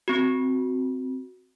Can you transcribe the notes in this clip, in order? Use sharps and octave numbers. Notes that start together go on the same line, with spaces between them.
C4 F#4